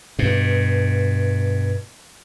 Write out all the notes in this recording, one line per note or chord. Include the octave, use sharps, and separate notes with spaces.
G2 B2